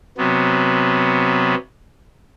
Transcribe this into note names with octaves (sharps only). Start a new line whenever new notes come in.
C3 F#3 B3